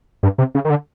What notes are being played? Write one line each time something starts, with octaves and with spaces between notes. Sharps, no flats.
G2
C3
C#3
D#3
D3